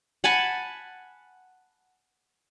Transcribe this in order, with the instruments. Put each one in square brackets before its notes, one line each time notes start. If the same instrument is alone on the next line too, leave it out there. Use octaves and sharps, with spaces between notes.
[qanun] F#5 G#5 A5 B5